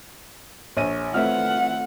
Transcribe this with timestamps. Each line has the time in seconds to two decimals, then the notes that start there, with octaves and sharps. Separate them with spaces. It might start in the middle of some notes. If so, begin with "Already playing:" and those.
0.77 A#1 C#5 D#7
1.14 A3 C4 F4 B4 E5 F#5 F6